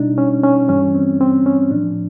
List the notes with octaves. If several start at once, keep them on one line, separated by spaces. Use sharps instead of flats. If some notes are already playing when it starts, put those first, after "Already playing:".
Already playing: B2 G3 D4 D#4
C#4
C#4
G2 E3 G3 C#4
C4
C4
C#4
A2 F3 D4